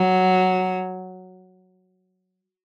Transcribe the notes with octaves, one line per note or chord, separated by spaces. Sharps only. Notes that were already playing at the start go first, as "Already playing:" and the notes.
Already playing: F#3